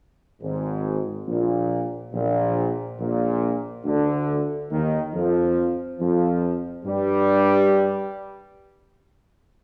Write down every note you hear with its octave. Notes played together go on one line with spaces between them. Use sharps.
G#1 G#2
A#1 A#2
A#1 A#2
A#1 A#2
D2 D3
D#2 D#3
F2 F3
F2 F3
G2 G3